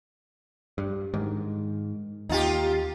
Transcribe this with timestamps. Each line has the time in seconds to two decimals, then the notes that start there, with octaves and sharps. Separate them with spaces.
0.78 G2
1.14 G#2 D#3
2.29 D#2 D#4 F4 G4